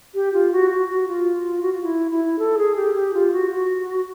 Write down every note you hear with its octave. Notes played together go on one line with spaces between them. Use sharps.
G4
F4
F#4
F#4
F#4
F4
F#4
F4
E4
E4
A4
G#4
G4
G4
F4
F#4
F#4